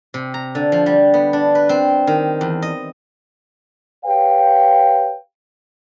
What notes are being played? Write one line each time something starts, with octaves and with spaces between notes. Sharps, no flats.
C3
A#5
D3
F3
G3
B3
D4
B4
C4
D#3
E2
D#5
G4 B4 C#5 F5 G5